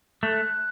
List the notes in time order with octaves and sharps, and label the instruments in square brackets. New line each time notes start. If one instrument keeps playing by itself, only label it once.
[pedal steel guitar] A3 [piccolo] F#6